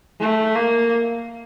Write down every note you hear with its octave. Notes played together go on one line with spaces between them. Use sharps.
A3
A#3